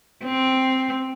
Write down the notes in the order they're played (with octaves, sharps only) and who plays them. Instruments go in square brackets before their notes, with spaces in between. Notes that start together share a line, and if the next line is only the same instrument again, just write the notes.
[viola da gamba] C4